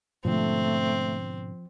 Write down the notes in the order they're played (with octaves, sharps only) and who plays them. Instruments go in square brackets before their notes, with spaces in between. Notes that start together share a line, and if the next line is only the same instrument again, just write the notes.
[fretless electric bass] G#2 B2 D3 [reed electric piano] F3 [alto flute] A3 [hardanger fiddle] C4